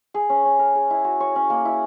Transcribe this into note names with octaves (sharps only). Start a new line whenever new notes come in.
G#4
C#4
C#4
A#4
G#4
E4
F#4
C#5
C#4
A#3
E4